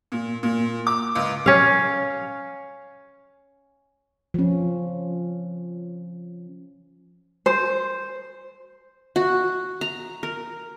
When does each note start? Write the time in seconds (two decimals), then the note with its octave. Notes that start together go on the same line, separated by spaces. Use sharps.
0.12 A#2
0.43 A#2
0.87 D6
1.15 C#2
1.46 C#4 F5
4.34 F3 C#4
7.46 C5
9.16 F#4
9.81 A#5
10.23 A#4